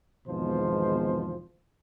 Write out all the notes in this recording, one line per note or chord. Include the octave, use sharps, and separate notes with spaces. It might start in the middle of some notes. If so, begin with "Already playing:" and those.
G#1 E2 B2 F3 G#3 C5